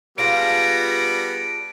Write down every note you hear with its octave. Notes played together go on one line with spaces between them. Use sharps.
G3 B3 D4 F4 G#4 A#6 D7